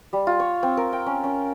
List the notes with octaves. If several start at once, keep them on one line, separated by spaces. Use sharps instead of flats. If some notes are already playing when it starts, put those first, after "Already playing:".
G3
F4
C#5
C4
A#4
G5
C#4
C#4